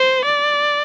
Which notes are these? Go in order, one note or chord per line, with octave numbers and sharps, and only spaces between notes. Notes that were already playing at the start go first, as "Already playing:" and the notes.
Already playing: C5
D5